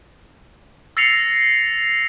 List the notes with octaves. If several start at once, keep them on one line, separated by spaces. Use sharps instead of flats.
E6 A6 A#6 C7 C#7 F7